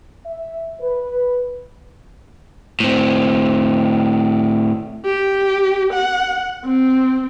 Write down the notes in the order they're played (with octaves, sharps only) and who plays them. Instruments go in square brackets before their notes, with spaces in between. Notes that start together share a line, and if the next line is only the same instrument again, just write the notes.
[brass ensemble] E5
B4
[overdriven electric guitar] A2 C4
[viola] G4
F#5
C4